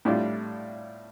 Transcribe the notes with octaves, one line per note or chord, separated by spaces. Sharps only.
A2 G3 D4 F4